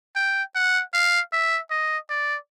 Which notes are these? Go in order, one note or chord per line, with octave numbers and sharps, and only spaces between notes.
G5
F#5
F5
E5
D#5
D5